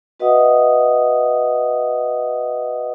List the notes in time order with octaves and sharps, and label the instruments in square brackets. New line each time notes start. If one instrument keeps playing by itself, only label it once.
[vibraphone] F#4 B4 D#5 E5 F#5 D#6